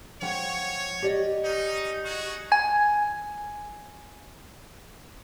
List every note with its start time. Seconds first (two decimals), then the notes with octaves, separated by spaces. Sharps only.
0.22 F3 C#5 F#5 G5
1.02 G4 D5 D#5
1.44 C#4 D#4
2.05 D#4 F#4 G#4
2.52 G#5 G#6